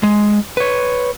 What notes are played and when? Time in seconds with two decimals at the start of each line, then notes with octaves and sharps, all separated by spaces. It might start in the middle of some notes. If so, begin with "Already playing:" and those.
0.03 G#3
0.57 B4 C#5